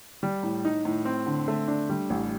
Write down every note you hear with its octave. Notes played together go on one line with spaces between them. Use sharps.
G3
A2
D#4
A2
C4
D3
A3
D4
G3
A1